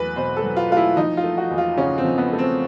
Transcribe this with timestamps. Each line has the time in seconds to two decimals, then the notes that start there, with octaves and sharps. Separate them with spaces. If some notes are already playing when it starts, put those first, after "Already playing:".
Already playing: E2 F#3 A3 B4
0.16 B2 C5
0.37 A4
0.44 F#3
0.57 F4
0.70 A3 F4
0.77 E4
0.97 F3 D#4
1.17 F4
1.24 A3
1.38 F#4
1.51 E2
1.58 F4
1.77 C#3 C#4
1.98 C4
2.05 F3
2.18 B3
2.32 A3
2.39 C4